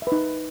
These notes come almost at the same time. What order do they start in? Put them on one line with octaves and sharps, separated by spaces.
E5 B4 D#4